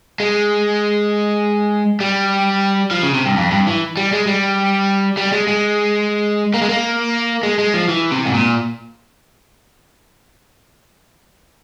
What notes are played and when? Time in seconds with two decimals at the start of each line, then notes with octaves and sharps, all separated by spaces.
0.20 G#3
2.00 G3
2.91 F3
3.03 C#3
3.14 C3
3.26 G2
3.37 F2
3.51 G2
3.67 E3
3.97 G3
4.12 G#3
4.27 G3
5.17 G3
5.32 G#3
5.47 G#3
6.54 A#3
6.62 G#3
6.69 A#3
7.43 G#3
7.59 G#3
7.74 F3
7.88 E3
8.12 C3
8.26 G#2
8.34 A#2